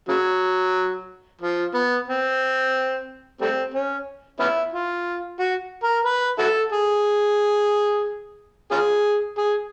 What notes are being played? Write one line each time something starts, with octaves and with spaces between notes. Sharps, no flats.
C#3 F#3
F3
B3
C4
G3 A3 C4
C#4
B3 C#4 E4
F4
F#4
A#4
B4
E4 F#4 A4
G#4
C#4 F4 G#4
G#4